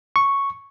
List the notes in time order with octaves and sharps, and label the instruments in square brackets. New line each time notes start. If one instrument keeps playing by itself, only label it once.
[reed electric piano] C#6